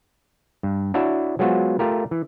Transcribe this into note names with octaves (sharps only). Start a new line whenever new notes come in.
G2
D4 E4 F#4 C#5 E5
F#3 G#3 B3 F4 F#4 C5
A3 F4 G4 A#4
E3